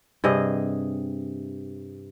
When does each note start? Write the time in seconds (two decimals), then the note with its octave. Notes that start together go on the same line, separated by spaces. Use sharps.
0.24 G2 C3 G#4 D#5